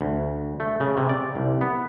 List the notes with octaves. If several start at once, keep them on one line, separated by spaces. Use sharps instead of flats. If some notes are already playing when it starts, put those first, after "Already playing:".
D2
A3
C#3
C3
D5
C2
B3